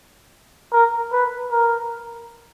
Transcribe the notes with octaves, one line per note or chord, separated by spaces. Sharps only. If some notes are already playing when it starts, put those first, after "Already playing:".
A#4
B4
A#4